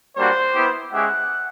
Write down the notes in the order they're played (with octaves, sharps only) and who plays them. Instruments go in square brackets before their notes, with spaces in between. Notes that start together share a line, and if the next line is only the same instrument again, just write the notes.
[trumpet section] G3 A#3 D4 F#4 C5
B3 E4 G4
G#3 C#4 E4 G4 F#5